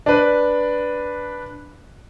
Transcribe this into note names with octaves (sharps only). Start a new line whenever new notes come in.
D4 B4